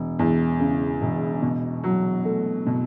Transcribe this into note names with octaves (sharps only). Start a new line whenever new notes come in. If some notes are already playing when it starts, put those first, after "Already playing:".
Already playing: E1
E2
C#3
E1
B2
F#3
A3
B2